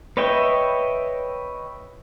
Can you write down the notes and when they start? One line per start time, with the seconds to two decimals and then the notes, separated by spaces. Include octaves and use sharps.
0.17 B4 C#5 D#5 E5 G5